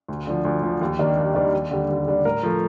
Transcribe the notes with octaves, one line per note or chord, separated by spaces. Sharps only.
D2
D3 F3
D2
D3 F3
D#2
D#3 G3 A#3 D4
D#2
D#3 G3 A#3 D4
D#2
D3 G3 D4
D#2
D3 G3 D4
A2 A#4
F3 A3